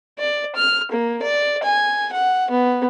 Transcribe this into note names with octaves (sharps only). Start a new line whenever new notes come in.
D5
F6
A#3
D5
G#5
F#5
B3